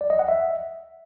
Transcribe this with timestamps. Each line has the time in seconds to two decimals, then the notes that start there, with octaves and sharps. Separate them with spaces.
0.01 D5
0.10 D#5
0.19 F#5
0.28 E5